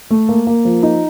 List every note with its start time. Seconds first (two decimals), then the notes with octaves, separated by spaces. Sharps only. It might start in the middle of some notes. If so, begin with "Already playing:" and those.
0.11 A3
0.29 A#3
0.47 A#3
0.65 F3
0.83 D#4